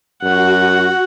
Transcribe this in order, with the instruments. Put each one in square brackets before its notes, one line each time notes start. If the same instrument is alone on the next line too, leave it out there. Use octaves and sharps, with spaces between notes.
[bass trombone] F#2 [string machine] F#4 [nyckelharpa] F#5